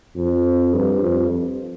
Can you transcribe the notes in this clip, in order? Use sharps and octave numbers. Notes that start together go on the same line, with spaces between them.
F2
G2
F2